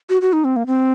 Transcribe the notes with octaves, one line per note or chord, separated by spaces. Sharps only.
F#4
F#4
D#4
C4
A#3
C4